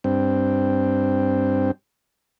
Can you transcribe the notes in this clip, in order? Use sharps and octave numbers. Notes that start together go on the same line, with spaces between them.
G2 C4